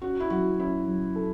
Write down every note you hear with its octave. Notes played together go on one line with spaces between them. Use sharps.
C#4 F#4
E4
F#3 F#4
C#4 E4
F#3
A4